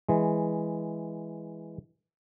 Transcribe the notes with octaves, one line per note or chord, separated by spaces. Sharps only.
E3 G#3